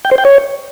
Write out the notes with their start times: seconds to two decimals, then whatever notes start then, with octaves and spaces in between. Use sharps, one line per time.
0.05 G5
0.11 C5
0.18 G5
0.25 C#5